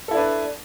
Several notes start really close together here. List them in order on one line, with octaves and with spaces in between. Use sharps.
A4 E4 D4 B4